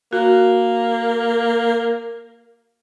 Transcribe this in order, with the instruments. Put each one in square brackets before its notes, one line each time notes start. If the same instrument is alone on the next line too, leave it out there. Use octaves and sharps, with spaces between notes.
[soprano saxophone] A#3 [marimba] F#4